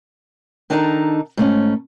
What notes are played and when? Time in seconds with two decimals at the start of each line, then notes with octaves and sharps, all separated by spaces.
0.70 D#3 D4 D#4 A4 F5 A#5
1.37 G#2 A3 C#4